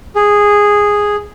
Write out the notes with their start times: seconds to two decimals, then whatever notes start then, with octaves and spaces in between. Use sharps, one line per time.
0.15 G#4